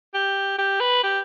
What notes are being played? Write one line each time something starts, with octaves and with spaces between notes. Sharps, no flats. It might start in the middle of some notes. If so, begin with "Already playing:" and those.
G4
G4
B4
G4